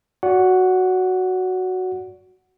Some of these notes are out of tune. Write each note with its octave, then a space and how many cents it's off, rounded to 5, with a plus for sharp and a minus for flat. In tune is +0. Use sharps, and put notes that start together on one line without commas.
F#4 +0 D5 -35 F#5 +0